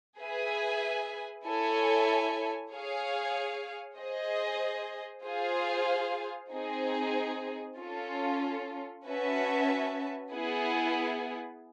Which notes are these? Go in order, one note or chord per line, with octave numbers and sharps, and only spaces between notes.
G#4 B4 E5 G#5
E4 A4 C#5 E5 G#5
G#4 C#5 F5
G#4 C5 D#5
F4 G#4 C5 F5
C4 D#4 G#4
C#4 F4 A4
C#4 F#4 B4 E5 A5
B3 E4 G#4 B4